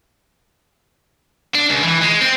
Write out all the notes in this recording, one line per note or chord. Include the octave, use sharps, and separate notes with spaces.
D4
C#2
E3
G#3
C4